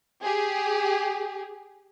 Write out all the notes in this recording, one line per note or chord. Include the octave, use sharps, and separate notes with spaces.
G4 G#4